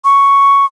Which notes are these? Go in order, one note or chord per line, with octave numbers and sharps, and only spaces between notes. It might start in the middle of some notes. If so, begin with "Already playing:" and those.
C#6